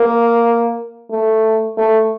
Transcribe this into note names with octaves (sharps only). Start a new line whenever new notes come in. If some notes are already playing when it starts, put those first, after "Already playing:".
Already playing: A#3
A3
A3